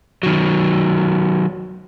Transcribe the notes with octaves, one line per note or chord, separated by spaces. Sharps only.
D#3 F#3